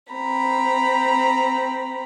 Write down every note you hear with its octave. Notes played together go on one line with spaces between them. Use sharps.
C4 A#5 B5